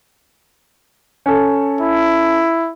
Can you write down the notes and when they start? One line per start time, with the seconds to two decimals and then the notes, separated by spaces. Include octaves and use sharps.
1.26 C#4 A4
1.81 E4